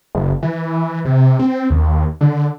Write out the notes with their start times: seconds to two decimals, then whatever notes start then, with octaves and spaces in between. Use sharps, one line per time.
0.15 F#1
0.43 E3
1.05 C3
1.39 C4
1.70 D#2
2.21 D3